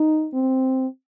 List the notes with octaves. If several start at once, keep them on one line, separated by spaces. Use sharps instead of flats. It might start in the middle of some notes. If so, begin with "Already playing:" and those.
Already playing: D#4
C4